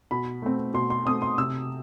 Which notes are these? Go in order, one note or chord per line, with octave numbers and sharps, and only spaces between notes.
B2 B5
A3 C4
B2 C6
C6
A3 C4 D#6
C6
C3 E6